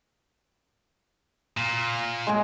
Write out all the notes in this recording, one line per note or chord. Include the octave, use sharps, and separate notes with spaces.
A#2
G#3 G#4